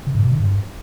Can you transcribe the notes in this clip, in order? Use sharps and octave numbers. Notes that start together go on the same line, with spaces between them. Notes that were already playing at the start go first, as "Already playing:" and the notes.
C#3
G#2
B2
D3
G2